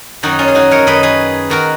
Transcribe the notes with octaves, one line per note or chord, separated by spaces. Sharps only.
F#2 D#3 D#4 F#4
C#4 F4
G#4
D#4 F#4
A#4 C#5
F#2 D#3 B4 D#5
G#4 B4
D#3 F#4 A#4